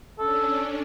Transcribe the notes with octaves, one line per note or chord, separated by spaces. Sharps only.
C#4 D4 A4